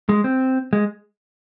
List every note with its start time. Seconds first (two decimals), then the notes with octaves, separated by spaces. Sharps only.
0.09 G#3
0.24 C4
0.73 G#3